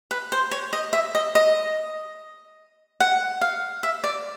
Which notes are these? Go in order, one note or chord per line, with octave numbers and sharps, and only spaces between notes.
B4
C5
C#5
D#5
E5
D#5
D#5
F#5
F5
E5
D5